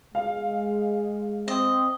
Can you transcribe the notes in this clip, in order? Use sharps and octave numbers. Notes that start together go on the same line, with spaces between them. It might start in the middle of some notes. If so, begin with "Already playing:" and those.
G#3 F5
C4 D#5